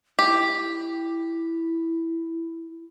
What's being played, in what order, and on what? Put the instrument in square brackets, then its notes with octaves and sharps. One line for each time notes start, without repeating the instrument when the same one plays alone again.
[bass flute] E4 [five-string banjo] G4